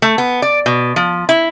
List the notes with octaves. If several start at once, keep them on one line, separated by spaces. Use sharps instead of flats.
A3
B3
D5
B2
F3
E4